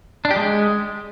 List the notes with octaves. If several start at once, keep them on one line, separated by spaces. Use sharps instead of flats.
D4
G4
G#3